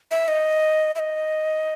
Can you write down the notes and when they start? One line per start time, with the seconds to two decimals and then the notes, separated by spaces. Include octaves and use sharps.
0.11 E5
0.28 D#5
0.95 E5
0.99 D#5